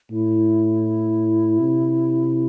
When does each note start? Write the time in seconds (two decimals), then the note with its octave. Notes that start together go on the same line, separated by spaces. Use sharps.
0.10 A2 E4
1.60 C3